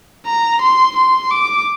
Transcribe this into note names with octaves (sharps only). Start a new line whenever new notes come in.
A#5
C6
C6
D6